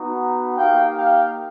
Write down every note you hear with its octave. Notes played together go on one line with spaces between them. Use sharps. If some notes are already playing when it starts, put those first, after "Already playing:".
Already playing: B3 D#4 F#4
A#3 D#4 G4 F5 G5
F5 G5